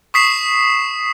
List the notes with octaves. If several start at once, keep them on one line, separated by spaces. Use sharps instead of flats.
C#6 D#6 B6 C7 E7